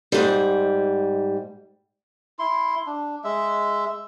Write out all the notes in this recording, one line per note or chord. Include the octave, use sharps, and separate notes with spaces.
G#2 G3
E4 C6
D4
G#3 E5